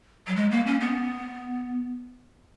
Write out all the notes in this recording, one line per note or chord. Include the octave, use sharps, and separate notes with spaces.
F#3
G#3
A#3
C#4
B3